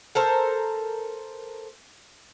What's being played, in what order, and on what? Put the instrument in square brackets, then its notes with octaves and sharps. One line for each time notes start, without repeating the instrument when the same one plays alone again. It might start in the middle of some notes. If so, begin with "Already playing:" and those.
[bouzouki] A4 A#4 C5